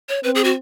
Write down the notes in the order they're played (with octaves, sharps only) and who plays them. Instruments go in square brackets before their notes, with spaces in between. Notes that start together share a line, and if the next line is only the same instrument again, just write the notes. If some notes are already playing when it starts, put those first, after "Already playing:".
[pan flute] C#5
[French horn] C4 [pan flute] B4
[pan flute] G#4
F#4